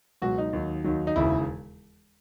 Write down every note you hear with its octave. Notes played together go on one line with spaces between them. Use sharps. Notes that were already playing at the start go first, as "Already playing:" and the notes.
C#2 B2 F#3 F#4
D#4
D#2 D#3 F#3
D#2 D#3 F#3
D#4
E1 D#2 C#3 E3 E4